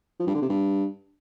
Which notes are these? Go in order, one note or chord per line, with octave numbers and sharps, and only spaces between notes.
F3
G2
D3
C3
G2